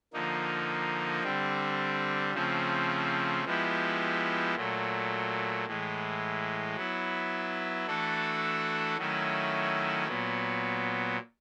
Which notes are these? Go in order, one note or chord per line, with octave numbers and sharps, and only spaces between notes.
D3 F3 A#3 D#4
D3 G3 C4
C#3 F3 A3 C4
F3 G#3 B3 E4 G4
A#2 F#3 A3
A2 E3 G#3
F#3 B3 E4
E3 A3 D4 F#4 A4
D#3 F#3 A3 C#4 E4
A#2 F#3 B3